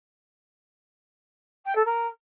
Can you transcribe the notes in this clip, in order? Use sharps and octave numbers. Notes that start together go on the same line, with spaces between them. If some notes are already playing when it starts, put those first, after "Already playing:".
G5
A4
A#4